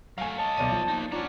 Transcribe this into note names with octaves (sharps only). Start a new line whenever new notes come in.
F#3 A3 F5 G#5
C#5 D#5 A5
B1 D5 D#7
F3
A#3 D#4
C#4 D4 F4 F#5 A#5